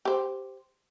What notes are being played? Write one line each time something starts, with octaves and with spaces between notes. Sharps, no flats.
G4 C5